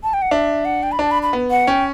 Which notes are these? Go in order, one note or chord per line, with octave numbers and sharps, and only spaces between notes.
A5
G5
F#5
D4 E5
F#5
G5
B5
D4 A5
B5
B5
B3
F#5
C#4 G5